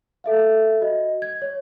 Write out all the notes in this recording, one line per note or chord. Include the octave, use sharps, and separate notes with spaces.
A4 E5 F5
F#4 D#5
G#6
C#5